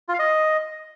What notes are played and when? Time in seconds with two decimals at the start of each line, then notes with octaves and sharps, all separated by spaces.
0.08 F4
0.14 F5
0.19 D#5